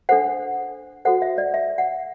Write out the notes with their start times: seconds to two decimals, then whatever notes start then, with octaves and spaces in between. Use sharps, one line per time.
0.09 D4 A4 C5 F#5
1.05 F#4 A4 C5 F#5
1.22 E5
1.38 D5
1.54 E5
1.78 F#5